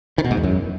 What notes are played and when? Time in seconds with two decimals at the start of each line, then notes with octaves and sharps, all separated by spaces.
0.18 D#3
0.24 B2
0.31 G#2
0.37 E2
0.43 F#2